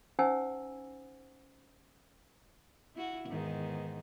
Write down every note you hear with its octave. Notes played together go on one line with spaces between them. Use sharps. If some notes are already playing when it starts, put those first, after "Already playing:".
C#4 D#4 C5 F#5 G#5 E6
E4 F#4
E2 G#2 D#3